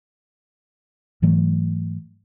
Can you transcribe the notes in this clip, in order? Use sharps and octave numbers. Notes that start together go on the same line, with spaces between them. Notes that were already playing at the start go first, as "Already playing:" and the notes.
G#2 E3 F#3 A3